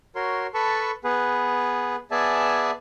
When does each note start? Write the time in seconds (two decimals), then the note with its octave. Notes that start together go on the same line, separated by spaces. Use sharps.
0.15 F#4 A#4 C#5 C6
0.54 A4 B4 A5 B5 C#6
1.04 B3 G#4 B4
2.11 B3 G#4 D5 E5 G#5 A5